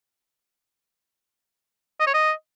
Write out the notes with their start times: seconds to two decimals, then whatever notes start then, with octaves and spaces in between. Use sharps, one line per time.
2.00 D#5
2.07 C#5
2.14 D#5